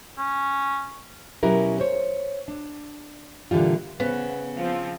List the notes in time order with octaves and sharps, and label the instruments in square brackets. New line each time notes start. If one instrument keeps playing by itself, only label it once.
[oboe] C#4
[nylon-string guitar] B2 F#3 C#4 E4 G4 A#4
C5 C#5
D4
A#2 D3 E3 G3 F4
[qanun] C#3 [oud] B3
[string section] F3 C4 [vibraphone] F5